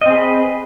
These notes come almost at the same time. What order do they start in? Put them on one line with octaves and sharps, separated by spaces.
D#5 C4 G#4 B4